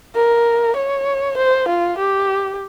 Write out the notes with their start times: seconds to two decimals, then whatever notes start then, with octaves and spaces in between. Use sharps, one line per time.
0.15 A#4
0.76 C#5
1.37 C5
1.68 F4
1.98 G4